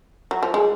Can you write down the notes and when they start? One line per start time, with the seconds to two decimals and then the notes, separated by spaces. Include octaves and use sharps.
0.31 F#3
0.43 F3
0.54 G#3